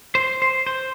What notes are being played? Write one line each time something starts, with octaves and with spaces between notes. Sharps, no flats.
C5
C5
C5